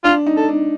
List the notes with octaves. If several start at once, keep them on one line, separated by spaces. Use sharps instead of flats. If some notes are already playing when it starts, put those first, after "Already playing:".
D4 F4
D#4
A4
D4